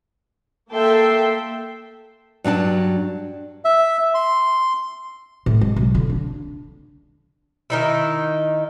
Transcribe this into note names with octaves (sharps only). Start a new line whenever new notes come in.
A#3 A4 E5 G5 A5 C6
G2 F#3 D4 A5
E5
C6
A2
G#3
B1
D3 E4
D4
D#3 D#4 E4